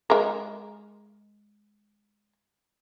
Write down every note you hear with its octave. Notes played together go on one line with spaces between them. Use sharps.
G#3 A#4